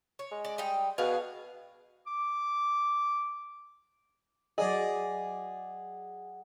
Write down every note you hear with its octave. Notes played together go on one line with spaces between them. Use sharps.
C#5
G#3
D5
G3 D#5 G5
B2 D4 G#4 F5
D6
F#3 G#4 D5 D#5 F#5